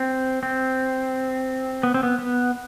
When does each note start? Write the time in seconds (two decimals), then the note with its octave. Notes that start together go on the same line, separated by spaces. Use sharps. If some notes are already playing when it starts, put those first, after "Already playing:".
Already playing: C4
0.43 C4
1.83 B3
1.94 C4
2.03 B3
2.19 B3